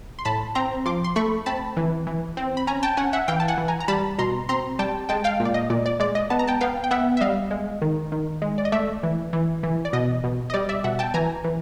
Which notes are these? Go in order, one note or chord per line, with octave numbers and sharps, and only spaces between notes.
C6
A2 A5 B5
C4 A#5 C6
F3 C6 D6
C6
A3 B5 C#6
C4 A5 B5
E3
E3
C4
B5
C#4 G#5 A#5
G5 A5
C#4 F#5 G#5
E5 F#5
E3 F5 G5
A5
F#5 G#5
E3
G#5 A#5
A#5
G3 A5 B5
B2 A#5 C6
C4 A#5 C6
G3 G5 A5
G#3 G5 A5
F5 G5
A#2
D5
D#5
A#2 D5
D5
G#3 D5
D#5
B3 A5
A#5
G5 A5
B3 F5 G5
G5
B3 E5 F#5
E5
G3 D#5 F5
G#3
D#3
D#3
G#3
D5
D#5
A3 D5 E5
E3
E3
E3
D5
B2 D#5
B2
D#5
G3 D5
D5 E5
B2 E5 F#5
G5 A5
E3 G#5 A#5
E3